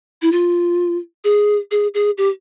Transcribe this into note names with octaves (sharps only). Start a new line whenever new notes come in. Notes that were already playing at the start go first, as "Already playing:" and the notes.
E4
F4
G#4
G#4
G#4
G4